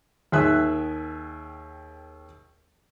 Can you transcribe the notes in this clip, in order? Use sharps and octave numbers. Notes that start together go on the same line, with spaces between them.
D#2 D#3 G#4 E5 E6 F#6